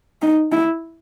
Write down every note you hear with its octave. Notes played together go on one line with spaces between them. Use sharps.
D#4
E4